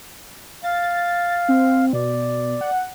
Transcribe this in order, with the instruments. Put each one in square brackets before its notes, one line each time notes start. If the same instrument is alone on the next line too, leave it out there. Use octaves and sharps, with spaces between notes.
[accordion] F5 [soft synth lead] A6
[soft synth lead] C4
[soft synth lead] B2 [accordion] D5
[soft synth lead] F#5